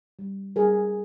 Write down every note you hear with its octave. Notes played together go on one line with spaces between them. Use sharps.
G3
G3 G#4 A#4